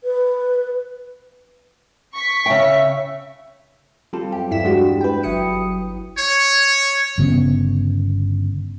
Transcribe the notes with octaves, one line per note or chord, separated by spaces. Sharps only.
B4
C#6 B6
C#3 E5 G5
G3 C4 F4 A4
F#2 G4
E2 G2 E4 B6 E7
G3 G#3 D4 F#4 G4
B4 G5
G1 F#3 E4 D#6 C#7
C#5
G1 C#3 B3 C#4